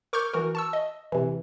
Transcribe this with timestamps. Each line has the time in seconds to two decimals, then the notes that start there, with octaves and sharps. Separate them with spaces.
0.13 A#4 C#6 D6 F6 G6
0.33 E3 F#4 A#4
0.55 A5 C#6 E6
0.73 D#5
1.12 C3 E3